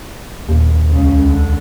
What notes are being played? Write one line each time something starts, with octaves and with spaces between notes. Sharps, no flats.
A#1 D#2
C#2 C#3
D3